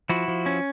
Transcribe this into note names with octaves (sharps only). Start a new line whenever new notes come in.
F3 E4 F#4
F3
C#4